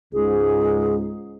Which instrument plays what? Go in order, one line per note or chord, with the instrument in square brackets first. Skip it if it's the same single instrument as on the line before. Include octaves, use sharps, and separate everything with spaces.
[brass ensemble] C#2 G#2 [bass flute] G#4